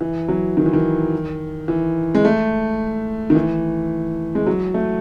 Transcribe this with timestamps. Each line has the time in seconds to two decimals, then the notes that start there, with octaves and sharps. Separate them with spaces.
0.01 E3
0.28 F#3
0.57 D#3
0.66 E3
0.73 D#3
1.68 E3
2.15 G#3
2.25 A3
3.30 D#3
3.35 E3
4.35 G#3
4.47 F#3
4.74 A3